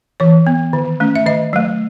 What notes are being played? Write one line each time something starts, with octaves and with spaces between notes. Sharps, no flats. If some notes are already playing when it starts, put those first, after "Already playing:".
E3 C#5
B3
D#3
A3 C#4
E5
D#3 D#5
F#3 A3